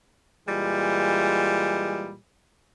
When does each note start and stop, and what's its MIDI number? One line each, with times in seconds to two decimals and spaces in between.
0.47 2.15 46
0.47 2.15 52
0.47 2.15 55
0.47 2.15 56